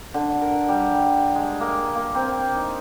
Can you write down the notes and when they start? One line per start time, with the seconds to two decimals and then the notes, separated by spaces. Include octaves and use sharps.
0.14 D3
0.41 A#4
0.69 G3
1.35 G#3
1.60 A#3
1.95 A#3
2.15 C4
2.56 D#4